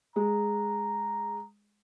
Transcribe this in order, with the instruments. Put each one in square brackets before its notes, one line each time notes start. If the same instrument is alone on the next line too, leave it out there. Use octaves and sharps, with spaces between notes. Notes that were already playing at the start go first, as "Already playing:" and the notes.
[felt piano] G#3 [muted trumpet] A#5